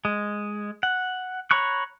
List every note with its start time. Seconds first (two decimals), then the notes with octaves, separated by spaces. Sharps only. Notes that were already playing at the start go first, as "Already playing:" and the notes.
0.05 G#3
0.83 F#5
1.51 C#5 A#5 B5 C#6 F#6